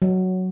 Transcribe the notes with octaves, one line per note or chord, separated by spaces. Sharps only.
F#3